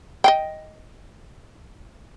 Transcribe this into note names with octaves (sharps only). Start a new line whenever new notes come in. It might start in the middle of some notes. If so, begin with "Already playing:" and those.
D#5 F5 G5